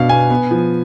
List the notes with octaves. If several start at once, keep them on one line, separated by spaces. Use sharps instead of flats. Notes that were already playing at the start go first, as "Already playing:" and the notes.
Already playing: B2 D4 F5
B3 G#5
B3
F3